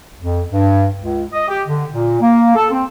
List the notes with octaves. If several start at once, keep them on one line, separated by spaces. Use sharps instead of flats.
F2
G2
C#2
D#5
G4
D3
A#2
A#3
A4
C4